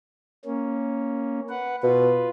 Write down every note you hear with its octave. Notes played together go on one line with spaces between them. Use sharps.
A#3 C#4
B4 F#5
B2 F4 B4